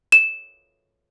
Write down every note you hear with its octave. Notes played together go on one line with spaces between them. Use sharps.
E7